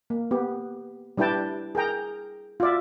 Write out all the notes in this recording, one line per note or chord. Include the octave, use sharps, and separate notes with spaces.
A#3
B3 G4
G3 D4 E4 B4 G5 A5
G#4 A#4 G5 A#5
F4 F#4 D5 E5